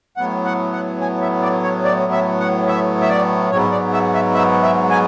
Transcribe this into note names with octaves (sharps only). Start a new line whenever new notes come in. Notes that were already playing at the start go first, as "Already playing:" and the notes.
A2 F#3 B3 F#5
F#5
F#5
G#5
E5
D5
C#5
D5
E5
F#5
E5
E5
D5
G#2 F#3 B3 C#5
D5
E5
E5
E5
E5
G#5